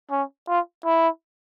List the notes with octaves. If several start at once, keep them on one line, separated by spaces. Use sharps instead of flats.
C#4
F4
E4